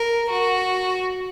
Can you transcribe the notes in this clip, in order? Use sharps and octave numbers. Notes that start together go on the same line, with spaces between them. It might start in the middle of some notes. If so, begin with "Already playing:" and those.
Already playing: A#4
F#4